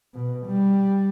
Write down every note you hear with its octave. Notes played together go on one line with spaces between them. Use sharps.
B2
G3